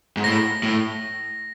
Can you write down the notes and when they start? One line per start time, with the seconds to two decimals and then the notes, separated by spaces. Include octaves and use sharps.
0.17 G#2
0.24 A2 A#6
0.63 A2